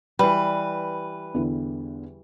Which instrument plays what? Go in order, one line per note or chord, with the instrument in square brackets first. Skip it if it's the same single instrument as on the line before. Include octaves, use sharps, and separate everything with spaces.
[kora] E3 G3 [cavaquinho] B4
[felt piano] E2 D3 E4